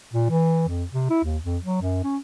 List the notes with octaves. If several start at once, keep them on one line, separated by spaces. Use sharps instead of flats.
A#2
E3
F2
C3
E4
D#2
F2
F#3
F#2
C#4